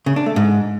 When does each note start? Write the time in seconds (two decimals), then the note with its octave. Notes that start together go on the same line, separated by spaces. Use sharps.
0.06 C#3
0.16 D4
0.26 A3
0.36 G#2